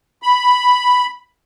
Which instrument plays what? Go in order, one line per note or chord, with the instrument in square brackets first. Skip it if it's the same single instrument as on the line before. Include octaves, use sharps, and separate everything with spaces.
[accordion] B5